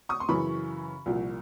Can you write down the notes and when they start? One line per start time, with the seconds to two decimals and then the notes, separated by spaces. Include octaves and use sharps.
0.09 C#6 D#6
0.20 C6
0.29 F#2 C#3 E3 B5 C#6
1.06 C2 A#2 F3